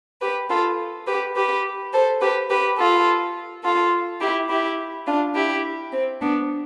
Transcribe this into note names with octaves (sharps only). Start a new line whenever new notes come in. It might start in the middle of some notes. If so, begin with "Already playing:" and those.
G4 B4
F4 A4
G4 B4
G4 B4
A4 C5
G4 B4
G4 B4
F4 A4
F4 A4
E4 G4
E4 G4
D4 F4
E4 G4
C4
B3 D4